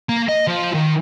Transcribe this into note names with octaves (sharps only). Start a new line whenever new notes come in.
A#3
D#5
F3
D#3